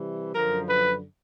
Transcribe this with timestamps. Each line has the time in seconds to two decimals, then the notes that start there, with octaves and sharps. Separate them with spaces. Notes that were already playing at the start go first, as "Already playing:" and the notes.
Already playing: C3 E3 G3
0.35 F#2 D3 F3 A#4
0.70 B4